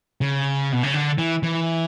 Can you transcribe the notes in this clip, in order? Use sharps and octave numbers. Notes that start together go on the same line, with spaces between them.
C#3
B2
C#3
D3
E3
E3